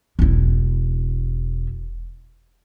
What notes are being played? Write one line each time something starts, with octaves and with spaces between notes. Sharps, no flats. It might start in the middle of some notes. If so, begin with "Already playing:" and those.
E1 E4